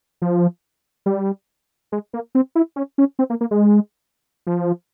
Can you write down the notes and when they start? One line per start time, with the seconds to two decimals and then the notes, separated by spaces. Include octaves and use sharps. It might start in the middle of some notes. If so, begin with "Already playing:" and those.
0.22 F3
1.06 G3
1.92 G#3
2.13 A#3
2.35 C4
2.55 E4
2.76 C#4
2.98 C#4
3.19 C4
3.30 A#3
3.41 A#3
3.51 G#3
4.47 F3